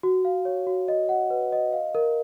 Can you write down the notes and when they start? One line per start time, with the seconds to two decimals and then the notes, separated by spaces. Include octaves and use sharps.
0.03 F#4
0.25 F5
0.45 C#5
0.67 F#4
0.88 D#5
1.09 F#5
1.30 B4
1.52 D#5
1.73 F5
1.95 A#4